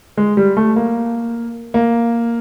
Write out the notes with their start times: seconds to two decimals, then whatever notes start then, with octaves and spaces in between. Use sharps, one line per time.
0.17 G#3
0.37 G3
0.57 A3
0.76 A#3
1.74 A#3